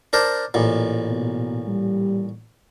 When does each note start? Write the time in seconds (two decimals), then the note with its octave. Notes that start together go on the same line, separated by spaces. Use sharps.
0.13 D4 A#4 C5
0.54 A1 A#2
1.10 B2
1.68 G3